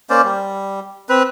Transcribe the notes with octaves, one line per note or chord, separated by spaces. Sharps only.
A#3 C#4 C5 D5
G3
C4 B4